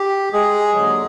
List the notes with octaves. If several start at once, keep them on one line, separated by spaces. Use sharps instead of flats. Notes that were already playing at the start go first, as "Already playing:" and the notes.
Already playing: G4
G#3 G#4
D#2 D3 F#3